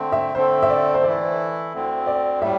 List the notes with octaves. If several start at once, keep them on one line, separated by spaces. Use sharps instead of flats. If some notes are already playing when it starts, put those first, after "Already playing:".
Already playing: D3 A3 C4
E5
D3 A3 C4 A4 C5
E5
D5
C5
E3 A3 E4 D5
D2 D3 C4
D5
A2 G3 E5